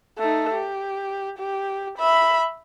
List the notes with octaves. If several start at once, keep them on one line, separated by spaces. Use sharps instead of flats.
A3 D#4
G4
G4
E5 B5